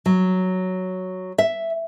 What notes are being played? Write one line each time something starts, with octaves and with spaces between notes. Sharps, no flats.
F#3
E5